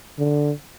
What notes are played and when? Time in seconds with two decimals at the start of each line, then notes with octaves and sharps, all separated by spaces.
0.19 D3